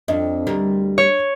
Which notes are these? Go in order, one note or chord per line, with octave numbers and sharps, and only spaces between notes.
F2 D4 D#5
D2 G3 A#4
C#5